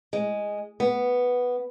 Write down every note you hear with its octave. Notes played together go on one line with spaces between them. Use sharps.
G#3
B3